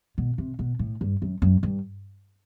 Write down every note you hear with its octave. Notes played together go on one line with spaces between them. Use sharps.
B2
C3
B2
A2
G2
F#2
F#2
G2